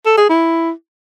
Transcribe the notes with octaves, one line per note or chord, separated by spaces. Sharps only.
A4
G#4
E4